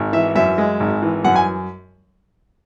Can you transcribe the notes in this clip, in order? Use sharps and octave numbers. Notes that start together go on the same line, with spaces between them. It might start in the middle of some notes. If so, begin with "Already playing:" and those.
Already playing: G#1
E3 E5
F#2 E5
G#3
G#1
E3
F#2 F#5
G#5